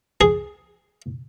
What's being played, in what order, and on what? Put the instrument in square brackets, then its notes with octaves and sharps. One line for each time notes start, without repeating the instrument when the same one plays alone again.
[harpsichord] G#4